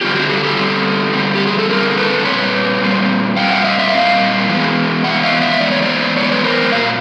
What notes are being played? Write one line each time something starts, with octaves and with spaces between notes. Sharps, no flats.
D3 G3 C4 F4 G4
F#4 G#4
G4 A4
G4 A4
D3 G3 C4
D3 G3 C4
G4
G#4
A4
D3 G3 C4 G#4 A#4
A4 B4
A#2 G3 C4 B4 C#5
A#2 G3 C4
A#2 G3 C4 F5 G5
E5 F#5
D#5 F5
D5 E5
A#2 G3 C4 D#5 F5
E3 G#3 B3
E3 G#3 B3 E5 F#5
D#5 F5
D5 E5
E3 G#3 B3 D5
C#5
C5 D5
E3 G#3 B3 C#5
D5
B4 C#5
A#4 C5
A#2 F#3 A#3 F5